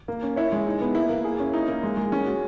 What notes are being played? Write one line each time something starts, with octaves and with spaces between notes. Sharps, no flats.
A#3
C#4
E4 C#5
G#3
D#4
B3
A#3 E4
A#3
G#4
C#4
D#4 E4
A#3
G#3
G#3
G#3 C#4
F#4